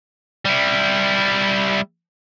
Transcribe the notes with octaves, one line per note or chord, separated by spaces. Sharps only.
G3 E4